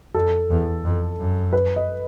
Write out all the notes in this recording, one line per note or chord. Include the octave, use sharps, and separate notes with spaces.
F2 A4
E2
F2
F#2
B4
D#5